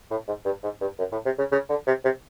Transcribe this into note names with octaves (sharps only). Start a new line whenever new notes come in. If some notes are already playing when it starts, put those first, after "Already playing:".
A2
G#2
G2
G#2
G2
F#2
A2
C3
C#3
C#3
D3
C3
C3